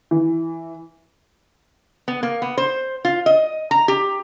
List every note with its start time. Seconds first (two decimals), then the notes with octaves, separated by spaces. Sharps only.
0.11 E3
2.08 B3
2.23 A#3
2.42 B3
2.57 C5
3.05 F4
3.26 D#5
3.71 A#5
3.88 G4